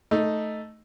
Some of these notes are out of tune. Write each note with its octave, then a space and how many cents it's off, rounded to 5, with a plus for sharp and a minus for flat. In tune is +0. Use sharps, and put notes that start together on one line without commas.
A3 +0 D#4 +0